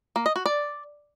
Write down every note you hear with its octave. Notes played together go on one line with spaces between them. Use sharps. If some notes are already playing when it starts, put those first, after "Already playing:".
A#3
D#5
F#4
D5